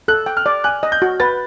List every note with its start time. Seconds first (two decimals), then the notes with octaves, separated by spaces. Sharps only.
0.08 A4 F#6
0.26 G5
0.37 F6
0.46 D5
0.64 G#5 F#6
0.83 D#5
0.92 G6
1.02 F#4
1.20 B4 A6